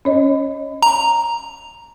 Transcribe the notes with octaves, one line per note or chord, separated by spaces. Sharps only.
C#4 C#5 D#5
A#5